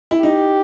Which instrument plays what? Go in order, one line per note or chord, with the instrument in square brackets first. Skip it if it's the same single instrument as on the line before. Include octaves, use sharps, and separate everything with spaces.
[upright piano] E4
[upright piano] D#4 [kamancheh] G4